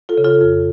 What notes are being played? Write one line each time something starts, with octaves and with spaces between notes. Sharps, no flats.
F4 A4
C#3
F4 A4
F2